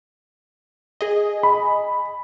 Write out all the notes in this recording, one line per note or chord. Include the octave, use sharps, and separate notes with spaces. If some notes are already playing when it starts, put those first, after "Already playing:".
G#4 D#5
B5